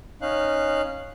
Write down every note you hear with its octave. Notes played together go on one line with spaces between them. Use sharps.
C#4 D#4 F5 F#6